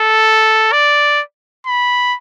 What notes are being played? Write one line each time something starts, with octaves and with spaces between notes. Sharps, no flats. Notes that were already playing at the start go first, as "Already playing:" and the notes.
Already playing: A4
D5
B5